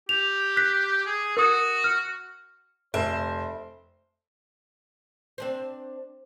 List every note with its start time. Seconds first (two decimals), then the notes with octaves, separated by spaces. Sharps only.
0.09 G4 F7
0.57 F#6 B6
1.06 G#4
1.37 F#4 A#4 D#6
1.84 F6
2.94 F1 C5 E5
5.38 C4 D4 C5